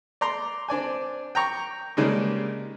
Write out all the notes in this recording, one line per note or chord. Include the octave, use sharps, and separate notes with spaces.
D5 A#5 C6
C4 D4 D5 G#5
G5 A#5 C#6
C#3 G3 G#3 A#3 D4 D#4